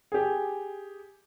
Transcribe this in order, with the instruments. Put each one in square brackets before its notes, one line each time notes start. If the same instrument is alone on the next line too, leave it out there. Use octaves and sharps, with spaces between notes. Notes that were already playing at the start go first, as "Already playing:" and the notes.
[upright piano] G4 G#4